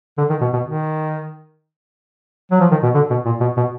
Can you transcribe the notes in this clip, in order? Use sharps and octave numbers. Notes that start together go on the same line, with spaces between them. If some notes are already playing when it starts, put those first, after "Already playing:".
D3
D#3
B2
B2
D#3
F#3
F3
D#3
B2
D3
B2
A#2
B2
B2